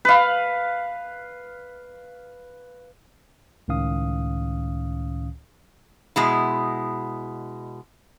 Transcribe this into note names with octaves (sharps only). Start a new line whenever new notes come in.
B4 F5
C#2 A2 D#3 C#4 F5 D#6
B2 G#3 E4